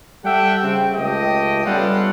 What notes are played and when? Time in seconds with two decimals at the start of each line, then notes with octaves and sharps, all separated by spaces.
0.24 G3 G4 A4 E5 F#5 G5
0.63 C#3 C4
0.94 C#2 A3 G4 D#5 G5
1.65 G3 B3 C#4 F4 A4 F#5